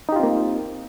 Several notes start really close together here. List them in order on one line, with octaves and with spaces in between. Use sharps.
D#4 G4 F4 C4 A#3